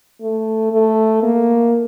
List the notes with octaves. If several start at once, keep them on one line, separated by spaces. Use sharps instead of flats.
A3
A3
A#3